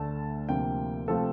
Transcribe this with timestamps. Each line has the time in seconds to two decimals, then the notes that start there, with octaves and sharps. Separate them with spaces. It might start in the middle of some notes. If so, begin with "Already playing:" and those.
Already playing: D2 D3 A3 A5
0.49 D2 C3 F3 A#3 G5
1.08 C3 F3 A3 C4 A4